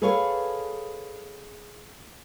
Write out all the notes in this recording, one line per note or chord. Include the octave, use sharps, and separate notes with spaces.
G#4 A4 B4 C#5 F5